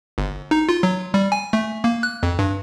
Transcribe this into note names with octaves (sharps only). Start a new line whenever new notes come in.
G1
D#4
F4
F#3
G3
G#5
A3
A#3
F#6
F2
G2